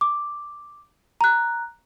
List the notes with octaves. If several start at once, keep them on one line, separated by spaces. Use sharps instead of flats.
D6
A#5 F#6